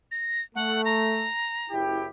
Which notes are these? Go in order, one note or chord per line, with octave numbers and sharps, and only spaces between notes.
A#6
A3 F#5
A#5
F#1 E4 G4